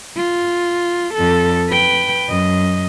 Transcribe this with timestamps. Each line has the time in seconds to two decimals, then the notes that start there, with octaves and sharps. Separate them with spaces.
0.17 F4
1.14 F2 A4
1.69 B4 G5
2.29 F#2 D#5